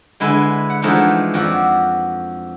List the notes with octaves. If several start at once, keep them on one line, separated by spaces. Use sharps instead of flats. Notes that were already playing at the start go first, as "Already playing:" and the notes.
D3 G#3 E4 B4 G#5
F#5
E3 F3 G#3 A3 D4 D#4
F2 F3 F#4 D5